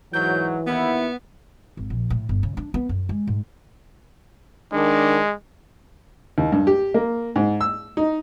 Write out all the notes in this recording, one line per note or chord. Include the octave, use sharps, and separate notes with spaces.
G#2 E3 F#3 G6
D#2 B3 E4 F#5
G#1
A#1
A2
G1
C#3
D4
B3
F#2
G#3
G#2
D#3 G#3 D4
D#2
G2
G4
A#3
G#2
E6
D#4